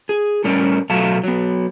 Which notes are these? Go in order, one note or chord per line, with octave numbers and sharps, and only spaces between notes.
G#4
A2 G3 C#4 A#4 D5
B2 F#3 A3 F5 A5
F#3 B3